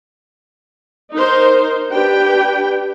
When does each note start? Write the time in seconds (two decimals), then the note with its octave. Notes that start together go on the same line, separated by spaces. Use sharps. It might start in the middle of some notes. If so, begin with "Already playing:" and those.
1.12 D#4 A#4 C5
1.89 D4 G4 B4 G5